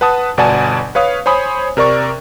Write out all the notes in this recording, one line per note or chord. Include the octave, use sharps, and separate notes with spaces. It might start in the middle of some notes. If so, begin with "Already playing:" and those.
B4 F#5 A5 D#6
G1 B2 D5 F#5 G#5 A5
B4 C#5 F5 D#6
C5 C#5 G#5 B5 D#6
C3 A#4 D5 C#6